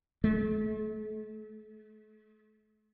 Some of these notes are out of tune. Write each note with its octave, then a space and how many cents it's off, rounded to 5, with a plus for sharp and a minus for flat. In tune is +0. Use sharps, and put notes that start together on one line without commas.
A3 -40